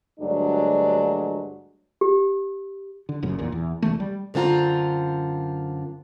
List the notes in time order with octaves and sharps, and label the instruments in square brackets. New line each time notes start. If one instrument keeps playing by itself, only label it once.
[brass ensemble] D2 G2 F#3 G#3 D4
[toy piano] G4
[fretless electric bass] D3
F#1 F#2 A#2 C#3
B1 E2 A#2
E2
E1 C2 E3 A3
G3
[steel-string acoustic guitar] F#2 D3 C4 F4 A#5